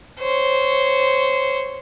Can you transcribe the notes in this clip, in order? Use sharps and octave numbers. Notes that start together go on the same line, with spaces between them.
C5 C#5